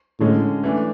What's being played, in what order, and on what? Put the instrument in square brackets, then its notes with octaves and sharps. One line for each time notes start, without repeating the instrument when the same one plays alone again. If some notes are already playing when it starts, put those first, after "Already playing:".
[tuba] A2 [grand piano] D3 G#3 C#4 G#4
[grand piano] E3 A3 D4